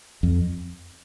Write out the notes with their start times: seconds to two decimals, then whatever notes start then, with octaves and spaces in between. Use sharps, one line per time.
0.23 F2